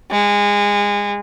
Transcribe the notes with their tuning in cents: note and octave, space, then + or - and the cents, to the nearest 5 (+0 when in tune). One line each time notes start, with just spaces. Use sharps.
G#3 -25